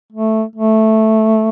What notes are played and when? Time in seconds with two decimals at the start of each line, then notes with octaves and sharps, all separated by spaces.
0.12 A3
0.55 A3